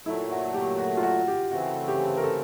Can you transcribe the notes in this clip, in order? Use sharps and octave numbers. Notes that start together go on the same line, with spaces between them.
A#2 F#3 A3 E4
F#4
G4
F#4
F4
F#4
G4
C#3 E3 A3 C4 F#4
G4
A#4
A4